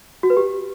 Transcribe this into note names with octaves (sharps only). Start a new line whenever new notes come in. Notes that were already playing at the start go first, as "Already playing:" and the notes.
F#4
B4
G4